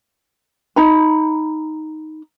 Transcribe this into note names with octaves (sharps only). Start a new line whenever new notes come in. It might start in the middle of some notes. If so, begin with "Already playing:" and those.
D#4 A#5 B5